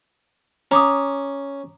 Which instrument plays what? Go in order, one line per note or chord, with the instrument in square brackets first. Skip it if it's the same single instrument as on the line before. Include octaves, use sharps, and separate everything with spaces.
[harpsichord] C#4 [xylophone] A#5 D6 D#6